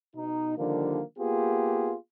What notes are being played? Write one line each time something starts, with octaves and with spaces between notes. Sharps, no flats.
B2 D#4
D3 D#3 F3 G3 A#3
A#3 B3 F4 G4 G#4